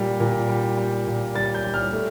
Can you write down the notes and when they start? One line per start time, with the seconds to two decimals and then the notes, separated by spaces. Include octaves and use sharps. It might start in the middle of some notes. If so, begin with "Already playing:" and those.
Already playing: A#2 G3
0.20 A#2
0.49 G3
0.77 G3
1.07 A#2
1.35 G3 A6
1.54 G6
1.64 G3
1.74 F6
1.93 A3